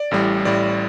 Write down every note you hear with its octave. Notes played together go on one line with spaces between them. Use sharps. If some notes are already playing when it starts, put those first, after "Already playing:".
Already playing: D5
A1 A2 G3
A1 A2 G3 D5